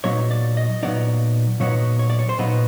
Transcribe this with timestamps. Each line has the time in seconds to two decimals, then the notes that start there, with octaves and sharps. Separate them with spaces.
0.04 A#2 F#3 B3 D#4 C#5
0.31 D5
0.57 D#5
0.83 A#2 F#3 B3 D#4 D5
1.60 A#2 F#3 B3 D#4 C#5
1.99 C#5
2.10 D5
2.19 C#5
2.29 C5
2.38 A#2 F#3 B3 D#4 B4